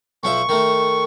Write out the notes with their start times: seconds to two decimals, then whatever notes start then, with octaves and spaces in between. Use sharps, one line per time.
0.24 B1 F3 E5 C#6
0.49 D#3 A3